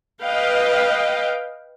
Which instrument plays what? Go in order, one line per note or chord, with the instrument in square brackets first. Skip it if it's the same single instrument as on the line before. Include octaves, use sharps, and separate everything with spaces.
[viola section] B4 D#5 F5 G5